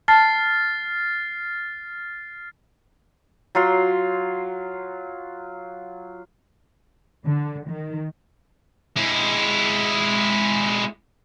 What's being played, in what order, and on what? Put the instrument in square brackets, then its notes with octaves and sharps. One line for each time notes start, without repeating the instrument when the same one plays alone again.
[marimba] A5 [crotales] F6 A6 C7
[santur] F#3 F4 C6
[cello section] D3
D#3
[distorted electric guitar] G#3 E4